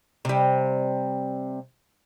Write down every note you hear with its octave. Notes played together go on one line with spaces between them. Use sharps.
C3 G3